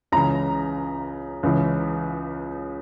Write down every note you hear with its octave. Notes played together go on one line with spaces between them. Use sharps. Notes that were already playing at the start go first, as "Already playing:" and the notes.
C#2 C#3 E3 A#5
C#2 C#3 E3